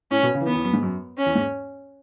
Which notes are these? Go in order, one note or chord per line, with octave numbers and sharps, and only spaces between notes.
A2 C#4
B2
C#3
E3
D#3 B3
E2
F#2
G#2
F#2
C#4
E2
G#2